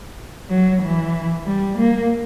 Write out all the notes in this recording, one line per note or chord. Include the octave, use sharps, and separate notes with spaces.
F#3
E3
G3
A#3